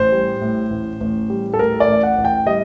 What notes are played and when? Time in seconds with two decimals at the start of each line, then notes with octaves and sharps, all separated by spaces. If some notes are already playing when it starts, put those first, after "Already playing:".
Already playing: A1 C5
0.12 G3
0.41 A2
0.70 A1
1.01 A1
1.30 G3
1.54 A4
1.59 A2 A#4
1.80 D5
1.88 A1
2.03 F#5
2.18 A1
2.25 G5
2.46 G3 D#5